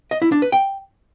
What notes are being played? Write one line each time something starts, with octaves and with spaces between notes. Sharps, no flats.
D#5
E4
D4
B4
G5